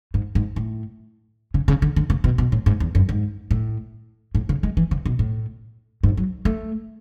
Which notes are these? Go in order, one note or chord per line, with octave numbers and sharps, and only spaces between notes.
G#2
G#2
A2
C#3
C#3
D3
D3
C#3
B2
B2
A2
G#2
E2
F#2
G#2
A2
A2
C#3
G#3
E3
C#3
B2
A2
G#2
F#3
A3